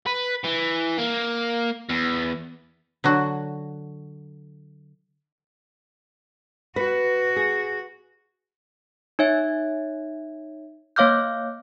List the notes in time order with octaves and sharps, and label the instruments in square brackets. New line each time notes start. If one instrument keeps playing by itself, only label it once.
[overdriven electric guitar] B4
E3
A#3
E2
[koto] D3 F#3 F#4
[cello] F#4 [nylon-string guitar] B4
[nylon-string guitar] G#4
[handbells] D#4 C#5 E5 G#6
A#3 C#5 F5 D6 F6 G6